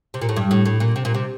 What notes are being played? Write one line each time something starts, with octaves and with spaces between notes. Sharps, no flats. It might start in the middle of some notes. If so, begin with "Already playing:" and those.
C3
A#2
A2
G2
A2
A2
A#2
C3
A#2
C3